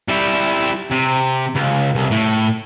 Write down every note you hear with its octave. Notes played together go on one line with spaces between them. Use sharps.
G3 E4
C3
C#2
C2
A2